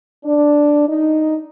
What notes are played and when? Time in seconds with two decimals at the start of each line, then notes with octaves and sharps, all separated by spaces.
0.25 D4
0.88 D#4